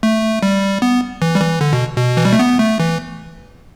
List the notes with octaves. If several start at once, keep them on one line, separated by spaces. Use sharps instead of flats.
A3
G3
B3
E3
G3
E3
D3
B2
B2
E3
G3
A3
B3
A3
E3